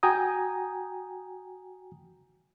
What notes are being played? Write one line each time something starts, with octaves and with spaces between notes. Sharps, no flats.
F#4 G5 G#5 A#5 D#6